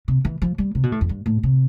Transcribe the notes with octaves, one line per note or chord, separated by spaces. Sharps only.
C3
E3
F3
G3
C3
B2
A2
F2
G2
A2
C3